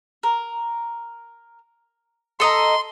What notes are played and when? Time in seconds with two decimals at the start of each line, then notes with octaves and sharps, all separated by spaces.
0.23 A#4
2.40 A4 D#5 A#5 C6